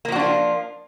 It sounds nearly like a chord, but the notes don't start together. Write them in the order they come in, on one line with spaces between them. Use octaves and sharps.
A#3 F3 F#4 D4 F4